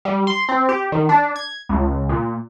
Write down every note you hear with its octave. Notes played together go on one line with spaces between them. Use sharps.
G3
C6
C4
G4
D#3
D4
G#6
C#2
A#2